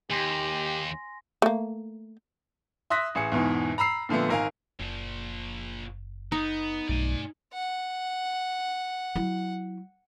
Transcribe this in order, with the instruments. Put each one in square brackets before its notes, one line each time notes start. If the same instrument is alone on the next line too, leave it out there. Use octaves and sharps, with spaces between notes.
[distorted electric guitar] D#2 [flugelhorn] G4 [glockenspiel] G#5 C6 A#6
[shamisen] A3 A#3
[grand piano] E5 C6 D#6 F#6 A#6 B6
A1 G#4 C#7
E2 G#2 B2 E3
A#5 B5 E6 C7
A#2 D3 F3 A3 B3
G#1 A#4 F5 G#5
[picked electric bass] F#1 [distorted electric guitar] A#2 F3
[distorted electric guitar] B3 [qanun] D#4
[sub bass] B1 [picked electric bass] G2 B2 A3 [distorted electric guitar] D5 G#5
[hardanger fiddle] F#5
[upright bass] F#3 E4